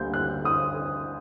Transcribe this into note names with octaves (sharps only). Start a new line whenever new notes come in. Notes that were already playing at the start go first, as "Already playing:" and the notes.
Already playing: D2 D3 G3 A#3 G6
F#6
D#6